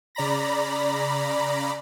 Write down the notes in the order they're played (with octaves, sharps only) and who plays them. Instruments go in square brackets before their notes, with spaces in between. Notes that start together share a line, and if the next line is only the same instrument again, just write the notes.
[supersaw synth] C#3 D5 A#5 B5 A#6